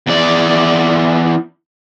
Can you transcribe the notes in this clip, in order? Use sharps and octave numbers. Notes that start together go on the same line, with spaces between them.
E2 D5